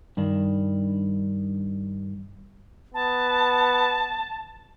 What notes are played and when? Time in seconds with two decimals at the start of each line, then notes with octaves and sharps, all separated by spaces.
0.17 G2 D#3 D4
2.94 B3 A5